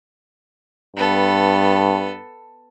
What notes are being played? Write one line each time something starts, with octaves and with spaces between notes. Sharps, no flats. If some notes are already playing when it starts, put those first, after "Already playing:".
G2 B3 A4